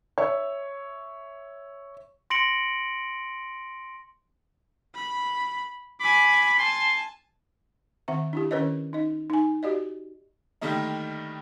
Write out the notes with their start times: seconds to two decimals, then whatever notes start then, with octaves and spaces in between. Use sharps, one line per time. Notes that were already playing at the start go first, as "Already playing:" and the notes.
0.18 C#5 E5
2.30 C6 A#6 C#7 D7 F#7
4.95 B5
6.00 G#5 B5 D6
6.59 G#5 A5 C6
8.08 D#3 C4 E5 F#5
8.33 D4 E4 G4
8.51 D#3 C#4 A#4 B4 C#5 D#5
8.93 D#4 D#5
9.30 D#4 G#5
9.63 F#4 G4 D5 D#5
10.61 D3 D#3 G3 A3 A#3 D#4